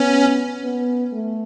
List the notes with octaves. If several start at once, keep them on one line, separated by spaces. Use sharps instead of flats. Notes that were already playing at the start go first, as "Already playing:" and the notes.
Already playing: B3 C#4
B3
A3